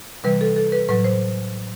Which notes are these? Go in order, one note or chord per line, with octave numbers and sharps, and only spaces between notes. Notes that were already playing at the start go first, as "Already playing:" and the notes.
C3 E3 G3 B4
A4
A4
B4
A2 F#3 B4
C5